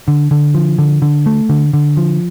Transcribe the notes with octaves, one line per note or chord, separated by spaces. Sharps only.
D3
D3
F3
D3
D3
A3
D3
D3
F3